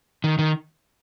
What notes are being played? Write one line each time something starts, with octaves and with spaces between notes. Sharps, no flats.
D#3
D#3